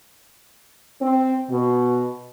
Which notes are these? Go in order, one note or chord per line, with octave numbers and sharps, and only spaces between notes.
C4
B2